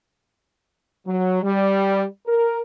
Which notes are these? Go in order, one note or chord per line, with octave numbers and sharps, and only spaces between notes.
F#3
G3
A#4